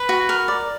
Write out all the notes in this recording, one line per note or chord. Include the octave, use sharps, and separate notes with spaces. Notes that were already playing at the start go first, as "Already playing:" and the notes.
Already playing: B4
F#4
A#4
D5